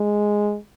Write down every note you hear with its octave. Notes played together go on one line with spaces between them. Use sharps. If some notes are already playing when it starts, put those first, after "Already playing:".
Already playing: G#3